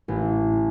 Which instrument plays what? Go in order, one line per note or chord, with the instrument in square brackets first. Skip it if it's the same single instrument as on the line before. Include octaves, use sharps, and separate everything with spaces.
[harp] A1